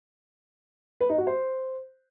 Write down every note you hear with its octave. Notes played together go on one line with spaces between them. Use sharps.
B4
D#4
F#4
C5